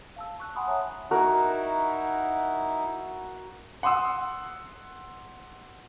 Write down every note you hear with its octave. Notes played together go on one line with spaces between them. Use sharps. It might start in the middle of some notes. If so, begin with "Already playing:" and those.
F5 A5 E6
A5 C#6 F#6
F#5 G#5 B5 C6 D#6 F#6
C#5 E5 F#5 A5 A#5 D#6
D#4 E4 F#4 A#4
F#5 C6 D#6 E6